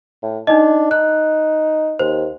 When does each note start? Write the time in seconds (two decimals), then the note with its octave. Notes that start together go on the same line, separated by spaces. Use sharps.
0.23 A2
0.47 D4 D#4 D#5
0.91 D#4 F#6
1.99 D#2 C5